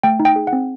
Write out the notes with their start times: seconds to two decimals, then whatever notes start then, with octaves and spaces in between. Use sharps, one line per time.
0.03 A3 G5
0.20 D#4
0.25 G5
0.36 G#4
0.47 F#5
0.53 C4